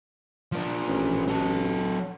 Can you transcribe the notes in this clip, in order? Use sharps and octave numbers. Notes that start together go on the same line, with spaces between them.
F3 D4
A1
F#3 A4